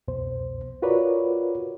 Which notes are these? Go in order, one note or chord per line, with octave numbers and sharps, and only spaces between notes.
C2 F2 B2 C5
F4 F#4 A#4 B4 C#5 D5